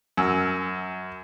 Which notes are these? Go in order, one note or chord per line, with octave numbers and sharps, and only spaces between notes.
F#2 E6